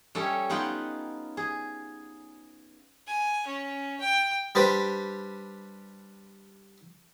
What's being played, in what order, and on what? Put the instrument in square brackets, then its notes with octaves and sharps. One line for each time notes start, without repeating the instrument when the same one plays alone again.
[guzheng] G3 C#4 A4 C#5 D#5 E5
B3 D#4 F4 B4 F#5 G5
G#4
[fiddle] G#5
C#4
G5
[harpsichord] G3 D4 G4 B4 C5